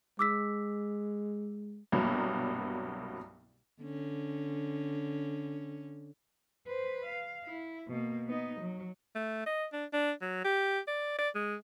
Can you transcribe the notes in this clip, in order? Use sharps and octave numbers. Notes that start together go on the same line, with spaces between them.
G#3 D6 E6 B6
C2 G2 B2 F#3 A#3 B3
D3 C#4
B4 C5
F5
E4
B2 A#3
B3 D#4
F#3
A3
D#5
D4
D4
F#3
G4
D5
D5
G#3